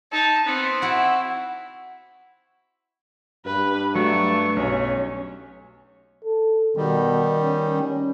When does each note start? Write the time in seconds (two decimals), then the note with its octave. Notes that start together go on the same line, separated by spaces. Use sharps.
0.12 D#4 A5
0.46 B3 C4
0.82 E4 F#4 F#5
3.46 G2 B4
3.95 F#3 A3 C#6
4.57 B1 C#4
6.24 A4
6.77 B2 D#3 G3
7.40 C#4